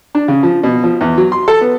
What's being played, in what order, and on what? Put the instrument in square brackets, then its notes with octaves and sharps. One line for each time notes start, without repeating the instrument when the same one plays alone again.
[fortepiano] D4
C#3
F3
B2
F3
E2
F#3
C6
A4
B3